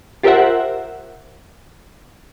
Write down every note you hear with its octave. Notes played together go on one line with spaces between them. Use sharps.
F4 G4 A#4 C5 E5 F#5